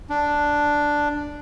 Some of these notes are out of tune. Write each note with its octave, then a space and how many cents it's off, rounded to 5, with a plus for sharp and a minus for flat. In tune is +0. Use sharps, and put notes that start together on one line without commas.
D4 +0